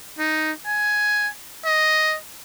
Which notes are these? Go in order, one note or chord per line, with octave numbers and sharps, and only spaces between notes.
D#4
G#5
D#5